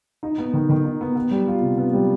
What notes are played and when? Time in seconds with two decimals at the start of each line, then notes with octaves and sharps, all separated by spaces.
0.23 D#4
0.38 B3
0.53 D#3
0.69 D#3
0.84 D#4
1.01 B3
1.16 B3
1.31 G3
1.47 F4
1.61 C3
1.78 B3
1.93 G3